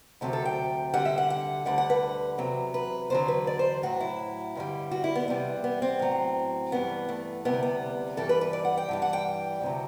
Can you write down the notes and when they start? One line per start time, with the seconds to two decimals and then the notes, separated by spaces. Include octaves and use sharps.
0.21 D2 C3 F#3 A4
0.33 A4
0.45 G5
0.94 D2 D3 G3 F#5
1.05 E5
1.18 F#5
1.30 F#5
1.65 D2 D3 G3 F#5
1.78 F#5
1.90 B4
2.38 E2 C3 F#3
2.74 B4
3.10 E2 D3 F#3 C5
3.28 B4
3.47 D5
3.59 C5
3.83 A2 F#3 F#4
4.00 E4
4.55 G2 D3 G3
4.91 F#4
5.04 E4
5.15 B3
5.27 E2 C3 G3 B3
5.64 B3
5.82 C4
5.99 A2 F#3
6.72 G2 E3 G3 B3
7.09 A3
7.45 D2 C3 G3 B3
7.63 B3
8.17 G2 E3 G3 A4
8.29 B4
8.41 B4
8.53 D5
8.65 F#5
8.77 G5
8.89 G2 E3 G3
9.02 F#5
9.13 G5
9.61 D2 C3 F#3